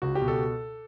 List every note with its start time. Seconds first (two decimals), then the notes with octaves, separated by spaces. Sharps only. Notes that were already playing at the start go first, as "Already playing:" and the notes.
0.02 C#2 F#4
0.15 G4
0.22 B2
0.28 A4